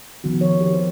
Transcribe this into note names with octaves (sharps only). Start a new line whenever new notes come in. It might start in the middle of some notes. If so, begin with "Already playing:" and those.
D#3 F3 B3 F#4
C#5
G4
C5